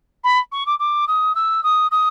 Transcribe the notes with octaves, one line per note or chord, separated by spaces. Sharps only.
B5
C#6
D6
D6
D#6
E6
D#6
D#6